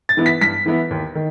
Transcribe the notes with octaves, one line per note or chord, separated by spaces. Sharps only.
A6
E3 B3 E4
B6
G2 B6
E3 B3 E4
D#2
D#3